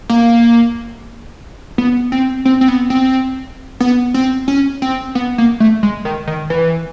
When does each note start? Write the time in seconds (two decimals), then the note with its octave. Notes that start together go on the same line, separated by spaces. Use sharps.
0.10 A#3
1.78 B3
2.12 C4
2.45 C4
2.61 C4
2.68 B3
2.90 C4
3.80 B3
4.14 C4
4.48 C#4
4.82 C4
5.15 B3
5.38 A#3
5.60 A3
5.83 G#3
6.05 D#3
6.27 D#3
6.50 E3